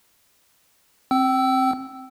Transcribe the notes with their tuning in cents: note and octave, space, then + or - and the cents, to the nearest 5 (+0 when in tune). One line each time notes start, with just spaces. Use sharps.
C4 +15 G5 -30 E6 +0